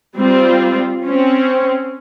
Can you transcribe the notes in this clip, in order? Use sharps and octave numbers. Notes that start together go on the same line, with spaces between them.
G3 C4 F4
C4 C#4